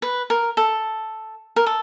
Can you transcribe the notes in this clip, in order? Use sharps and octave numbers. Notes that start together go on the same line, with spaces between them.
B4
A#4
A4
A#4
A4